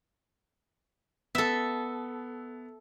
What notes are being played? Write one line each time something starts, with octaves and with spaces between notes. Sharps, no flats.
B3 A4 E5